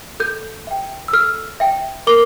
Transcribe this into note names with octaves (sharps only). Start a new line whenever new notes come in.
A4 G6
E5 G5
E6
A4 F6
E5 G5
A#4 D6